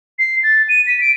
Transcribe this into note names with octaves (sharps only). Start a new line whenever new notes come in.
C7
A6
D#7
B6
D7